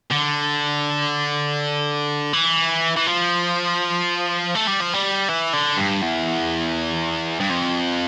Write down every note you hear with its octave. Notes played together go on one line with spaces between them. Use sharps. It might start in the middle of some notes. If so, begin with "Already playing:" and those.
D3
E3
E3
F3
A3
G3
F3
G3
E3
D3
G2
E2
G2
F2